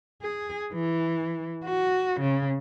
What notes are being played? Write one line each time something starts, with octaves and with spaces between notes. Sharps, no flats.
G#4
E3
F#4
C#3